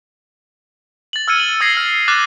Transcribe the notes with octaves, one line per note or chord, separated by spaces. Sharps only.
A6 F#7
E6 F6 G#6 C#7 D#7
F#7
D#6 E6 G#6 A#6 C7
F6
D6 F6 F#6 A6